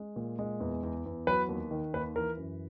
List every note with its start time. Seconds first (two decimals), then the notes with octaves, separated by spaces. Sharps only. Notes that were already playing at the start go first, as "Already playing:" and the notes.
Already playing: G#3
0.16 A#2
0.39 G#3
0.60 E2
0.83 E2
1.06 E2
1.27 F#3 B4
1.49 D#2
1.71 D#3
1.94 D#2 B4
2.16 E3 A#4
2.37 F#2